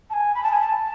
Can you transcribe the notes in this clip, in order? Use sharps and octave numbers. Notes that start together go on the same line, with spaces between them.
A5
G#5
B5
A5
G#5
A5